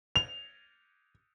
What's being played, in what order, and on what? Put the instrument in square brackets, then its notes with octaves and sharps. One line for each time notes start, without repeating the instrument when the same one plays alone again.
[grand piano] F7